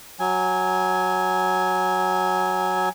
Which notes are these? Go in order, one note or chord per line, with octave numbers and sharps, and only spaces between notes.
F#3 G#5